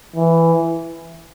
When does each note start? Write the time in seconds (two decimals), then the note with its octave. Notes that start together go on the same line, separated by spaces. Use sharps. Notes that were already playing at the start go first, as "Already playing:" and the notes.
0.16 E3